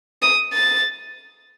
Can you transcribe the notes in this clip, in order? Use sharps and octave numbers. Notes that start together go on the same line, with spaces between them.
D#6
A6